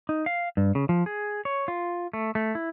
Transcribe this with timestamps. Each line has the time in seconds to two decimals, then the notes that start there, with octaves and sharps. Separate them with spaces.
0.09 D#4
0.26 F5
0.57 G2
0.75 C#3
0.89 F3
1.06 G#4
1.45 C#5
1.68 F4
2.13 A3
2.35 A3
2.55 E4